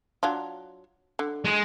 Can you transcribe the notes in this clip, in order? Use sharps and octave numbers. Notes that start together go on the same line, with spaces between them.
F#3 D4 F4
D3
G#3